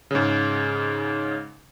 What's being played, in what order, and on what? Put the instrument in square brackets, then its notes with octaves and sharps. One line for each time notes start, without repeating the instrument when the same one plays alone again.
[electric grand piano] G#2 C#3